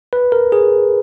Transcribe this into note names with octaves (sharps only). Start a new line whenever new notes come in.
B4
A#4
G#4